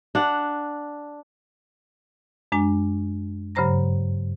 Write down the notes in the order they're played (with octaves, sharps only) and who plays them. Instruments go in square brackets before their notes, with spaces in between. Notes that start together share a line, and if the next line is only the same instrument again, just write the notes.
[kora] D4 F#5
[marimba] F#2 G#3 D4 G#5
G2 C#3 F#3 C5 A#5 A#6